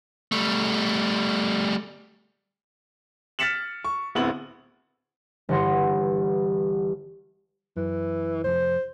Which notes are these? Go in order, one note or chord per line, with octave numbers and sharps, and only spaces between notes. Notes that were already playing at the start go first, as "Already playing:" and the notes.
G3 A3
F6 A6 B6 C#7 E7 F#7
C#6
D1 B3 C4 E4 F#7
G1 E3 F#5 C6 A#6
F#2 E3
F1 F2 C5